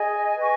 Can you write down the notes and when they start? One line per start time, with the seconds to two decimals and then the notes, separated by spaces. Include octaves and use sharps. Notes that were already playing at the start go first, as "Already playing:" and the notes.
Already playing: G#4 D#5 G#5
0.36 B4 D#5 G#5 C#6